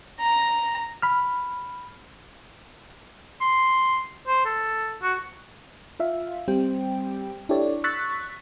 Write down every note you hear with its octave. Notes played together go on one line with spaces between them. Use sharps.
A#5
B5 F6
C6
C5
A4
F#4
F4 E5 F5
G3 C4 G4 C5 G5
D4 E4 G4 A4 C#5 D5
C#6 E6 F#6 A6 B6